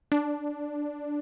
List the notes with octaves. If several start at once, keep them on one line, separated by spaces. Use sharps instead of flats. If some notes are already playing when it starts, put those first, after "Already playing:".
D4